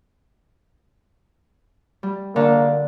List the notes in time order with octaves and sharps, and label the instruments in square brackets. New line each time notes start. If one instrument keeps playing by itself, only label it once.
[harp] G3
[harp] D3 [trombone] A#3